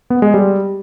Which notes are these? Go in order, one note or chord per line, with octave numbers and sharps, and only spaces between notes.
B3
G#3
G3